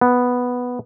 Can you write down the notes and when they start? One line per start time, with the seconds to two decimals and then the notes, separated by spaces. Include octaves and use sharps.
0.01 B3